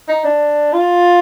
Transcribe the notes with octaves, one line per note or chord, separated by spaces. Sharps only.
D#4
D4
F4